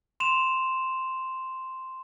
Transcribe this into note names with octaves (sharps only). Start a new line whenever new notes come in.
C6 E7 F7